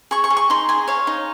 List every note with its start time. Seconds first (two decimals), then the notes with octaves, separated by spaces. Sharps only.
0.11 G#4 C#6
0.24 C#6
0.30 G#4
0.37 C#6
0.50 D#4 C6
0.69 G#4 G#5
0.88 C#5 F5
1.07 D#4